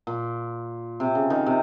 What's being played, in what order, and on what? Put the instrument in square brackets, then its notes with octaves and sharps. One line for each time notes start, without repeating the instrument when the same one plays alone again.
[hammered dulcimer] A#2
C3
C#3
D#3
C3